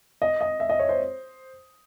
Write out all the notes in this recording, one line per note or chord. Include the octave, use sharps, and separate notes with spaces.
D#5
D#5
E5
D#5
C#5
C5